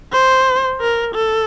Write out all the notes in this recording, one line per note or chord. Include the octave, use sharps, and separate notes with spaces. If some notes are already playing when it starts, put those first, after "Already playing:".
C5
A#4
A4